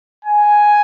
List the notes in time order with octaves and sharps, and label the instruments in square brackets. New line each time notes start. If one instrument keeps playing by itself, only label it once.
[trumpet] G#5